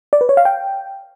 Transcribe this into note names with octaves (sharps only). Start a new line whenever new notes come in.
D5
B4
C#5
F5
G5